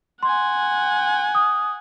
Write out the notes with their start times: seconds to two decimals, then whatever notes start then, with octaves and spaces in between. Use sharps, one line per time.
0.23 F#5 G#5 C6
1.35 D#6